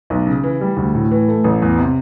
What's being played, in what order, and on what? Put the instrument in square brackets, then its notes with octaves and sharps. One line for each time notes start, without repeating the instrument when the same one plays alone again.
[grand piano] B1
C#3
E3
G3
D2
A2
E3
A3
A1
E2
C3